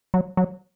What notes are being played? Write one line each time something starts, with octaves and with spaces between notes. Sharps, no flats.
F#3
F#3